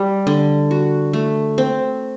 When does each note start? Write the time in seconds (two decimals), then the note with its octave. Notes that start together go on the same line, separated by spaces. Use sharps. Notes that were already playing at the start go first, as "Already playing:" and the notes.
Already playing: G3
0.27 D3
0.71 F#4
1.13 A3
1.58 C4